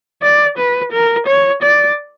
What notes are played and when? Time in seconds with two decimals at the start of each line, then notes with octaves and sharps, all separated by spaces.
0.23 D5
0.58 B4
0.92 A#4
1.27 C#5
1.63 D5